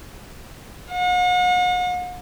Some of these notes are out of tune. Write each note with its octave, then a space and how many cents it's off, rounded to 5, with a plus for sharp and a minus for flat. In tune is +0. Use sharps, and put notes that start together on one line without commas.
F#5 -45